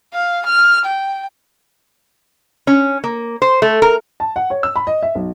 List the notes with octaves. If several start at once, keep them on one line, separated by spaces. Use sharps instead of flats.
F5
F6
G5
C#4
A#3
C5
A3
A#4
A5
F#5
C#5
E6
B5
D#5
E5
B1